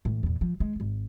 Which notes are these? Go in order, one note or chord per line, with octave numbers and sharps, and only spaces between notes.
A2 E3
E2 A#2
F3
G#3
D#1 G#1